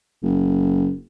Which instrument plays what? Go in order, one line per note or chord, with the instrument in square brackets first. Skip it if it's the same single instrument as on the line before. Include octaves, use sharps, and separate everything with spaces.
[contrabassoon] F#1